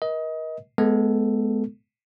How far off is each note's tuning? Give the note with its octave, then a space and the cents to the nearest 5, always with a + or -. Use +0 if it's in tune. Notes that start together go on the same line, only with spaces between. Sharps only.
A#4 +40 D#5 +25
G#3 +30 B3 +0 A4 +0